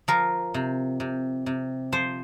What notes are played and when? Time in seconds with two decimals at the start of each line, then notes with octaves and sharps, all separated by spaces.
0.08 F3 A#4
0.54 C3
1.00 C3
1.46 C3
1.92 F3 C5